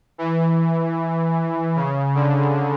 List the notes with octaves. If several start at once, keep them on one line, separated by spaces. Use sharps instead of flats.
E3
C#3
D3